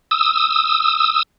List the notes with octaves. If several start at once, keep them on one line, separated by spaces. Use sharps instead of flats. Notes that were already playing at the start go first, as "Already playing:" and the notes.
D#6 E6